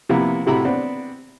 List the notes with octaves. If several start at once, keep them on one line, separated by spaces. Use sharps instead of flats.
C3 F3 A#3 B3 E4
A2 C3 E4 F#4 A#5 B5
B3 C4 D4